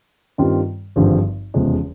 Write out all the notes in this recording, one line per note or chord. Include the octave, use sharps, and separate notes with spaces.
G2 D#3 G3 C4 F4
G#1 G2 D3 F3
F1 E2 C#3 F3 G#3